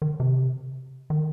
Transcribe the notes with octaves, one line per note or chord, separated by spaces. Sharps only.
D#3
C3
D#3